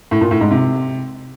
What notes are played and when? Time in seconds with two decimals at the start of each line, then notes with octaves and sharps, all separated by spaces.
0.11 A2
0.21 A#2
0.31 A2
0.41 G#2
0.51 C3